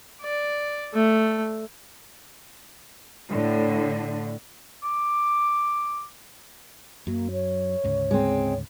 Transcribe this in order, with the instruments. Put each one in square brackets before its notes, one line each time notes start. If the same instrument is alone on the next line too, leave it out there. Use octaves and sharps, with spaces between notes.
[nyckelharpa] D5
A3
[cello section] A2 D3
[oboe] D6
[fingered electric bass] F#2 F#3 [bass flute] A#3
[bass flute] C#5
[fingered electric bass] D2 G#2 C#3
[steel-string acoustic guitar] G#3 C4